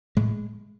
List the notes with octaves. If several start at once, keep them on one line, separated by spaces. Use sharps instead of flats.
A2 G#3